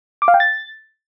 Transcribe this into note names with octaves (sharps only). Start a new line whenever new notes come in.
D6
F5
G5
A6